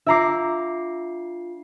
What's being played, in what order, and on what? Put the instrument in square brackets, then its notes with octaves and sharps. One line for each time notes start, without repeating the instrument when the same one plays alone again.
[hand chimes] D4 F4 C7 [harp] E5 A#5 D6